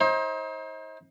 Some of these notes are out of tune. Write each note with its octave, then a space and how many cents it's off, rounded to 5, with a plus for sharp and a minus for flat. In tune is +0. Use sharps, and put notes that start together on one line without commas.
D#4 +35 C5 +35